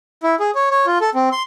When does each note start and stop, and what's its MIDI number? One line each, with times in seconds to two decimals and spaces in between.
0.23 0.35 64
0.40 0.51 68
0.55 0.69 73
0.70 0.86 73
0.86 0.98 65
1.01 1.10 69
1.15 1.29 60
1.32 1.43 84